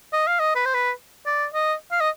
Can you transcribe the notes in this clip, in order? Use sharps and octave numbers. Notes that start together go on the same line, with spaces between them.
D#5
F5
D#5
B4
C5
B4
D5
D#5
F5
D#5